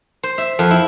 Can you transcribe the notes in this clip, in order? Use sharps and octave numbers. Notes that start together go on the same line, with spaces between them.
C5
E5
F2
E4